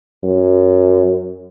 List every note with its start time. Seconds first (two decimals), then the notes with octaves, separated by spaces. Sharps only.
0.23 F#2